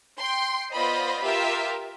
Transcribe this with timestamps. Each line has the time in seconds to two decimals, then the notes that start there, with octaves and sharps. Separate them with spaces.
0.18 G5 C6
0.72 B3 F4 C5 D5 D#5 B5
1.23 F4 G4 A#4 E5